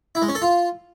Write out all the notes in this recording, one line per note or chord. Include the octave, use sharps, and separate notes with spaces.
E4
G#3
C#4
A4
F4